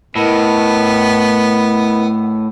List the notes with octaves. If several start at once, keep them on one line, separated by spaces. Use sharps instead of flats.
A2 B3 E4 A#4 D#5